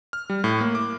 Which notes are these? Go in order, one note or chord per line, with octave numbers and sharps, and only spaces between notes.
F6
G3
A2
A#3
D6